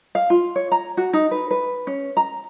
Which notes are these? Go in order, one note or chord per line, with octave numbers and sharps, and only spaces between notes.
F5
F4
C#5
A#5
F#4
D#4
B4
B4
C#4
A#5